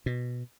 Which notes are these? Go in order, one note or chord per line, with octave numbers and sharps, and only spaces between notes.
B2